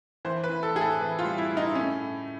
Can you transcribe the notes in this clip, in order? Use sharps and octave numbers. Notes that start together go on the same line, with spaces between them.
E3 C5
B4
E3
A4
A2 G#4
A4
E3 B4
F4
G3
E4
A2
D#4
A3 C#4
A2